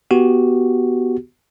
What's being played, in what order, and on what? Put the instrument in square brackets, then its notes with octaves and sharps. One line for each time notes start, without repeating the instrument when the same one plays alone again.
[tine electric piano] B3 F#4 G4